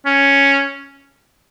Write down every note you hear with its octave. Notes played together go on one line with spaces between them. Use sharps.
C#4